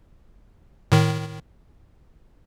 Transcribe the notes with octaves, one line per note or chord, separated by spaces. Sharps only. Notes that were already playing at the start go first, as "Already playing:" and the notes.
A2 D#3